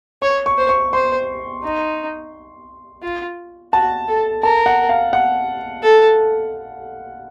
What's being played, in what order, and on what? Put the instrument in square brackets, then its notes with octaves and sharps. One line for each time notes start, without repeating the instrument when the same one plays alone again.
[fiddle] C#5 [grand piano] C#6
[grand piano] C#6
[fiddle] C5
[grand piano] C#6
[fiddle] C5 [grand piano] C6
[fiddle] D#4
F4
[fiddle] F#4 [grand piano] A5
[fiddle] A4
[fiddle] A#4 [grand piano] A5
[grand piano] F#5
F5
F#5
[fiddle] A4